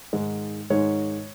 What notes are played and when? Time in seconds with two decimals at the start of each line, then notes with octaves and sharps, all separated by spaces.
0.13 G#2 D#3 G#3
0.70 G#2 D#3 G#3 C#5